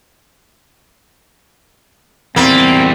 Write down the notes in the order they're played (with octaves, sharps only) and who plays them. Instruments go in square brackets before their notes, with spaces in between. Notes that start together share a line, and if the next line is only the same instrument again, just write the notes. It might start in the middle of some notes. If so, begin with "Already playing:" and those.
[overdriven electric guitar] E2 G3 [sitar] A#3 [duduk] C4